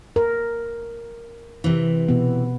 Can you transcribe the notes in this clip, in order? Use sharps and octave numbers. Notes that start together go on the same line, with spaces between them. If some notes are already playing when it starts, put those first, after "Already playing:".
A#4
C3 E3
B2 B3